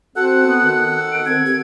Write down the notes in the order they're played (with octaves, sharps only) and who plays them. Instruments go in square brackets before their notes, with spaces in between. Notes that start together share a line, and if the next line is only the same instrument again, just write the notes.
[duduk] C4 [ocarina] F#4 [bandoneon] A4 F#5 [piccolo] F#6
[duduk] B3
D#3
[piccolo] D7
[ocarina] C4 [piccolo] G#6
[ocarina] G4